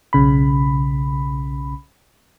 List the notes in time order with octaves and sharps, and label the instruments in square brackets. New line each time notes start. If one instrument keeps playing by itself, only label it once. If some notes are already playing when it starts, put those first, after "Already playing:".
[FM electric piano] B1 C#3 B5